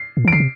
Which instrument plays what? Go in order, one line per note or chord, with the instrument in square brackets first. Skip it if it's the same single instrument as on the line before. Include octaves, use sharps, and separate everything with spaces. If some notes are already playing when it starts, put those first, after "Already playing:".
Already playing: [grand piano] C7
[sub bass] A#2
E3
[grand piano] D7
[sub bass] D3 [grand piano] C7
[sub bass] C3